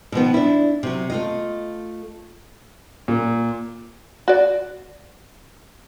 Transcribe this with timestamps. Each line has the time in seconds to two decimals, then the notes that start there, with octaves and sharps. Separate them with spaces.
0.12 B2 D#3 F3 B3
0.34 D4 E4
0.83 C3 F#3
1.10 A3 F4 D#5
3.08 A#2
4.28 F#4 D5